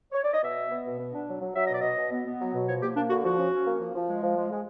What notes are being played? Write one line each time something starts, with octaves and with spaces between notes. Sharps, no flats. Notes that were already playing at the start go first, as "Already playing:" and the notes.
C#5
D5
D#5
B2 E5
B3
B3
B2
B3
D4
F#3
F#3
F#3 E5
D#5
B2 D5
B2 D#5
B2
B3
B3
F#3
B2
F3 C#5
A#3 G4
A#3 D4
D3 F#4
F3 F#4
C#4
C#4
A#3
F3
F3
G#3
F3
G#3
G#3